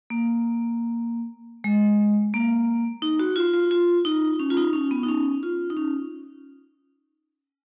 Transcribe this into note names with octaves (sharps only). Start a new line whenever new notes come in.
A#3
G#3
A#3
D#4
F#4
F4
F4
F4
D#4
C#4
F4
D#4
C#4
B3
D#4
C#4
F4
D#4
C#4